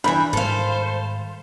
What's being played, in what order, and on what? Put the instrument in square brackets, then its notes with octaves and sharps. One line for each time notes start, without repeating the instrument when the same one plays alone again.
[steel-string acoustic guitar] G2 E3 [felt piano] B5 [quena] G6
[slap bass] G#2 D#3 G3 [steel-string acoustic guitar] A4 F5 [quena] C5